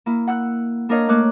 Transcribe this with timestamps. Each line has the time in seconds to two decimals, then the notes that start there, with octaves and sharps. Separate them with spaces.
0.06 A#3 E4
0.27 F#5 E6 F#6
0.89 A#3 D4 A#4 C#5 D#5 F5
1.09 A3 A#3 C#5 D6 F#6